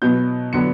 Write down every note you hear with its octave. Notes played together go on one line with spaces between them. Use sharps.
B2 F#3 B3 G6
D3 F#3 B3 C#7